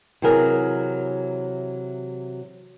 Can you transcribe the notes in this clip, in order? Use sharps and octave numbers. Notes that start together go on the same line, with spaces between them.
C3 E3 F#3 G#4 A#4